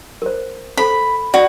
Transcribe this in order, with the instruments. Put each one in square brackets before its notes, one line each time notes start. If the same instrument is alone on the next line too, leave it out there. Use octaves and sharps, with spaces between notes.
[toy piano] A#4 C5
[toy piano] A4 C5 [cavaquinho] B5
[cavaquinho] F#4 [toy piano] D5